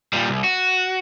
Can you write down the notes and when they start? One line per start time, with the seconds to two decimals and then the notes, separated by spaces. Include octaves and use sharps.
0.13 A#2 G3
0.30 C2
0.44 F#4